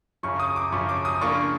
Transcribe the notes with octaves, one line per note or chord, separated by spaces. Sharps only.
F#2 C#3 F3 C#6
D#6
D6
F#2 C#3 F3 C#6
D6
D#6
C#3 F3 A#3 D4 F4 C#6